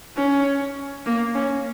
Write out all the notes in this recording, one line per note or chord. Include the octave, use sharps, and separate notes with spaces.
C#4
A#3
C#4